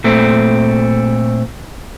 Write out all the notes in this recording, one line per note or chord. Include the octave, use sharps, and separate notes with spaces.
A#2 A3 C4